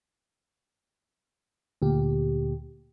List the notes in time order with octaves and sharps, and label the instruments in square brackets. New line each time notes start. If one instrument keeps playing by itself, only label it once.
[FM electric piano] D2 A#2 G4